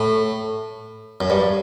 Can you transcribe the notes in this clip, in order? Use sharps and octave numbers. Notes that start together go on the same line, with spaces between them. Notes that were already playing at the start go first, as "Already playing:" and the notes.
Already playing: A2
F#2
G2